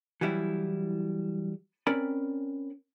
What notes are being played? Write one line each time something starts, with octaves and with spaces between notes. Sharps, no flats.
E3 F#3 G3 E4
C4 C#4 A#4 D5 B5